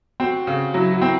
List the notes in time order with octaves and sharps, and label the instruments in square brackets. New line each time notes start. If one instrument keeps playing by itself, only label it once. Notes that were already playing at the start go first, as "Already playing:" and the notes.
[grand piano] C4 [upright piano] F#4
[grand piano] C#3
[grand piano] F#3 [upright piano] E4
[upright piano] F#4
[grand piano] C4